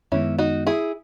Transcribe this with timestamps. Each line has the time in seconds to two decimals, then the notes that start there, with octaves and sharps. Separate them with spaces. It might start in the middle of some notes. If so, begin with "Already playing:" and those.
0.12 F#2 D#3 G#3 B3 C#4 E4
0.39 D#4 F#4
0.67 E4 G#4